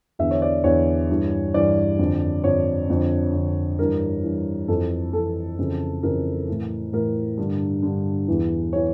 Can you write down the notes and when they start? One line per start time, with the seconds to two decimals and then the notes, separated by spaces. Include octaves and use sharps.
0.19 E2 D3 E5
0.31 C#5
0.42 D5
0.64 E2 D3 C#5
1.09 G2 E3
1.54 G2 E3 D5
1.99 F2 D3
2.44 F2 D3 C#5
2.89 F2 D3
3.34 F2 D3
3.79 G2 E3 A#4
4.24 G2 E3
4.68 F2 E3 A4
5.13 F2 E3 A4
5.59 F2 C#3 E3
6.03 F2 C#3 E3 A#4
6.48 A2 E3
6.93 A2 E3 A#4
7.38 G2 D3
7.83 G2 D3
8.28 E2 E3
8.73 E3 C#5